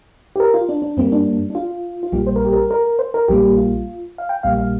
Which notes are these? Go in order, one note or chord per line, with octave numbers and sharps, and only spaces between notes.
G4
A#4
F4
D4
D4
G2 G3 A#3 C4
D4
D4
F4
F4
A#1 A#2 G3 A#3 G4
C5
A#4
G4
A#4
A#4
C5
A#4
A#1 A#2 G3 A#3 G4
F4
F5
G5
A#1 A#2 G3 A#3 F5
F5